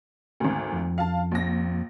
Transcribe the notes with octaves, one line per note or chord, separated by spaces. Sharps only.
G#1 D2
F2
F5 A5
A#1 A#6